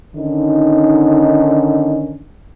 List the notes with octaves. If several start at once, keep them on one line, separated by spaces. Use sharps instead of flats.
D3 D#3 C#4 D#4